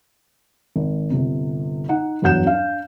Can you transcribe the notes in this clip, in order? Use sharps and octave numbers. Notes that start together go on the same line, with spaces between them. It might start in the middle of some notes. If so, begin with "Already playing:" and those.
G#1
G1 C3
D#4 F#5
E2 G2 F#3 F#5 G6 E7
D4 F5